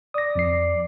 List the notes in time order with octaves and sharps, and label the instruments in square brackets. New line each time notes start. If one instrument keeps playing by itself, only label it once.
[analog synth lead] D5 [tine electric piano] D#6 A#6
[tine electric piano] F2 F3 C7